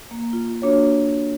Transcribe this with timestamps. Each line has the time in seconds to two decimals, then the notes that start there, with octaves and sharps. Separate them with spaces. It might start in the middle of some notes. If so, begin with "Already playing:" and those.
0.11 A#3
0.33 F4
0.62 A#3 D4 F#4 C#5